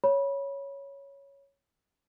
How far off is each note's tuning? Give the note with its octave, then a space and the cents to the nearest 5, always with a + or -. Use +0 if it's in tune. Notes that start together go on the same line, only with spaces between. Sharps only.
C#5 +0 B5 -25